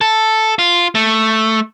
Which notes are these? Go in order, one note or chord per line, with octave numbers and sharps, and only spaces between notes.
A4
F4
A3